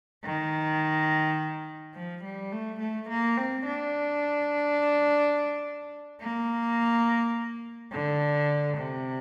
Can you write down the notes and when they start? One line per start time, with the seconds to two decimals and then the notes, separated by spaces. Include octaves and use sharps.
0.24 D#3
1.95 F3
2.23 G3
2.52 A3
2.80 A3
3.09 A#3
3.37 C4
3.65 D4
6.21 A#3
7.92 D3
8.77 C3